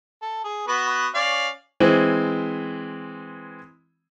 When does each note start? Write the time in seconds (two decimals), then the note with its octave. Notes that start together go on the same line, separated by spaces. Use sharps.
0.22 A4
0.44 G#4
0.68 B3 F#4 B4
1.15 C#4 D5 F5
1.80 E3 G#3 C4